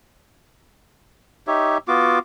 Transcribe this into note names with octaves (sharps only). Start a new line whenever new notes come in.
D#4 G4 C#5 E5
B3 F4 F#4 D6